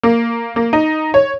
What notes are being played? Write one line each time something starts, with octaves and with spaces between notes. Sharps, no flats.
A#3
A#3
D#4
C#5